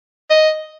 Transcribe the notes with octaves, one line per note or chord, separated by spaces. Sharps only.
D#5